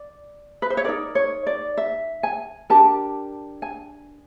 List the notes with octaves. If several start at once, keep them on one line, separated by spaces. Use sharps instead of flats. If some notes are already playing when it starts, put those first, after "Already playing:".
Already playing: D5
B4
C5
C#5
D#4 F#4 A#4 D5
C#5
D5
E5
G#5
D4 G4 A#4 A5
G#5